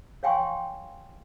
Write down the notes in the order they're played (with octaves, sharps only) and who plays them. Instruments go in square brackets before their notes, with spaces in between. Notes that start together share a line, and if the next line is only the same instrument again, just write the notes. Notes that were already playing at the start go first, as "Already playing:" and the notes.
[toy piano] C#5 F5 G5 G#5 C6 C#6